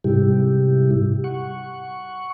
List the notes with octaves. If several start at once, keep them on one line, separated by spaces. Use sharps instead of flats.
G#2 C3 G3 E4 G4
F#5 C#6